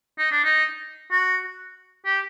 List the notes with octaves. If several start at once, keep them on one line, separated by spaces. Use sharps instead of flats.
D#4
D4
D#4
F#4
G4